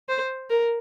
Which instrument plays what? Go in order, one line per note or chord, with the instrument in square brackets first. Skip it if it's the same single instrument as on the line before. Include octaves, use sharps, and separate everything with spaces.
[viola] C5
A#4